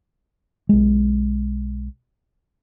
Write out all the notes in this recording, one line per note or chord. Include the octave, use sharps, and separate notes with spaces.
B1 G#3